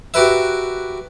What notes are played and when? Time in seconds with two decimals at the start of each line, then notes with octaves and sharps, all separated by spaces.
0.14 F#4 G4 A#4 B4 E5